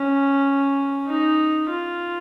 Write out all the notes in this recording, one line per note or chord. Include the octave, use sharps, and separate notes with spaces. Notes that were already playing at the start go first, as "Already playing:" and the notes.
Already playing: C#4
D#4
F4